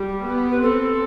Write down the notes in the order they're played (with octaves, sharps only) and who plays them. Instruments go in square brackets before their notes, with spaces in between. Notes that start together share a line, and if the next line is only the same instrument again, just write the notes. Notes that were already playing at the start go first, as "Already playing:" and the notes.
Already playing: [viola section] G3 [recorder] G4
[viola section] B3
[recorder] B4
[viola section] C4 [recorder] A4